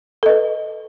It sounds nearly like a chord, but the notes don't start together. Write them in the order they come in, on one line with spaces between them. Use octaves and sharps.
A4 D#5 B4